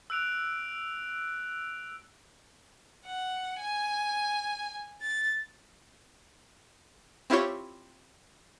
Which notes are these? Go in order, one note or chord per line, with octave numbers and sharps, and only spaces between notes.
E6 F#6 D7 F7
F#5
G#5
A6
C4 E4 F4 G4 C#5